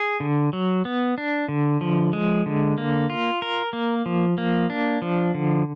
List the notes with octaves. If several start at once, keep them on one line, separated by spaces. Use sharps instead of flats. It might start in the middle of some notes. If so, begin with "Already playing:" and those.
Already playing: G#4
D3
F#3
B3
D4
D3
F3
G#3
D3
A#3
F4
A#4
A#3
F3
A#3
D4
F3
D3